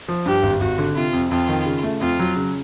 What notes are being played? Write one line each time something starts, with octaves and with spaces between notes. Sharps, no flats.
F3
G2 G4
G#1
G#1 F#4
D3
C3 F4
F2
F2 F4
D#3
C#3
A3
F2 F4
F#3
C#3